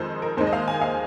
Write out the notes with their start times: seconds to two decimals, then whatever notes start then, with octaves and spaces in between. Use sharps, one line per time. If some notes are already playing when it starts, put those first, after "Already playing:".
Already playing: F2 D#3 G#3 C5
0.22 A#4
0.37 D#2 D#3 G#3 C5
0.47 D#5
0.53 F5
0.68 G#5
0.81 F5